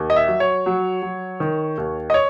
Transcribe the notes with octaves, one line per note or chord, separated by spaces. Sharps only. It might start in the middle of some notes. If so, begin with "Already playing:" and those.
Already playing: D#2
D#5
E5
F#3
C#5
F#3
F#3
D#3
D#2
D#5
C#5